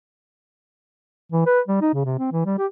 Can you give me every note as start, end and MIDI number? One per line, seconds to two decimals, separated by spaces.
1.32 1.45 52
1.46 1.60 71
1.68 1.79 55
1.81 1.91 63
1.94 2.04 49
2.05 2.17 48
2.18 2.29 60
2.32 2.42 52
2.45 2.54 55
2.58 2.66 67